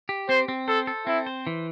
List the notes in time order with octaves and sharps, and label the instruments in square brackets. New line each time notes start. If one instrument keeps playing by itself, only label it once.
[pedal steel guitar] G4
[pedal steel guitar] C4 [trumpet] C5
[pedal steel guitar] C4
[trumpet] A4 [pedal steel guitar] C5
[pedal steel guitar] A4
[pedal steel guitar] C4 [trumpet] E4
[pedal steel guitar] C5
E3